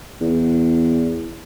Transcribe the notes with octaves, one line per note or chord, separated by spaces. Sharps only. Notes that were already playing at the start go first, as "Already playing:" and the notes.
E2